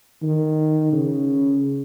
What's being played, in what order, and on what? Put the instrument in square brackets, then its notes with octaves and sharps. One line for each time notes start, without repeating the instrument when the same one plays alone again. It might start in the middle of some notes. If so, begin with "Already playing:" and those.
[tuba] D#3
C#3